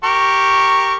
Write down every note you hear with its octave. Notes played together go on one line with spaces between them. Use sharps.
G4 A#4 C#6